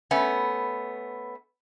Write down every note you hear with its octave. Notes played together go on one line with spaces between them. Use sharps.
A3 B3 C#4